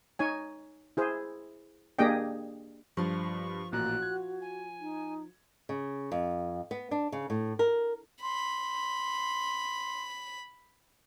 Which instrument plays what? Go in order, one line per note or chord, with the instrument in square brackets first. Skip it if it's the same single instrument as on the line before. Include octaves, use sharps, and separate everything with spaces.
[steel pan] D#4 C#5 G#5
E4 G#4 C5
A#3 D4 G4 G#4 D#5 G5
[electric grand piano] G2 [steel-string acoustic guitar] F3 F4 [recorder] C#6
[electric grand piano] A1 A#2 A#5 [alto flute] F#4 [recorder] F#6
[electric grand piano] G#6
[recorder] G#5
[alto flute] D#4
[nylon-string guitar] C#3
F2
B3
D4
C#3
A2
A#4
[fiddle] B5 [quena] C6